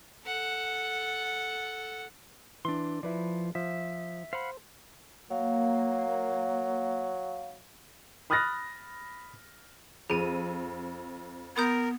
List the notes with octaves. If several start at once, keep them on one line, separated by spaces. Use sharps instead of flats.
A4 F#5
E3 D4 C6
F3 E4 B4 D5
F3 E5
C5 F5 F#5 B5
F#3 A#3 F5
B5 D#6 F6 F#6 A6 A#6
F2 G#4 D#7
B3 A#4 B5 D#6 G6